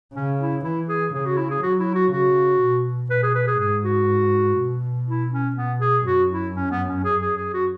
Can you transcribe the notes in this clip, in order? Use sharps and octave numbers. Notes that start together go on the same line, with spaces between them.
C#3 C#4
E4
E3 E4
G#4
C#3 G#4
F#4
E4
G#4
F#3 F#4
E4
F#4
C#3 F#4
B2
B2 B4
G#4
B4
G#4
G#2 G#4
F#4
B2
E4
C#4
B2 B3
G#4
F#2 F#4
E4
C#4
B3
C#4
G#4
G#4
G#4
F#4